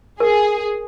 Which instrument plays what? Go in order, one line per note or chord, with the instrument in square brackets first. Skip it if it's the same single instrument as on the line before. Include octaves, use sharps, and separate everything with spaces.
[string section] G#4 [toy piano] A#4